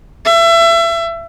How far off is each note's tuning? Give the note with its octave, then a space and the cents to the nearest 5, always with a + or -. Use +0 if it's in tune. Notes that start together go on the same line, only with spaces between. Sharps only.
E5 +30